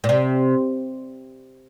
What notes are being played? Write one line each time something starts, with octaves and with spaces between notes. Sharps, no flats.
A#2
C3